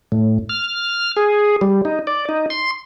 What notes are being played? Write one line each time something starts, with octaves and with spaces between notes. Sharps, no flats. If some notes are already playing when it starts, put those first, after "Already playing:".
A2
F6
G#4
G3
D#4
D5
D#4
C6